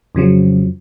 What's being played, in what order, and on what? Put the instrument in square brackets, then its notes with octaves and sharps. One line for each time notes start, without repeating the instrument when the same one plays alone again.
[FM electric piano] F2 C#3 F3 F#3